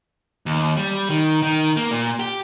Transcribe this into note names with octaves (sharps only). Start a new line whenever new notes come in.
D#2
G3
D#3
D#3
A#3
A#2
G4